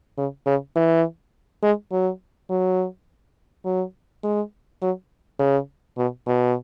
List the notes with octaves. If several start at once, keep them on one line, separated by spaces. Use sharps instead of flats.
C#3
C#3
E3
G#3
F#3
F#3
F#3
G#3
F#3
C#3
B2
B2